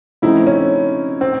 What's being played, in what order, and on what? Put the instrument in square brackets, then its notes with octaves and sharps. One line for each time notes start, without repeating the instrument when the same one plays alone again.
[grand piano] C#3 F3 A3 C4 D#4 [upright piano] E4
[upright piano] C#4
C4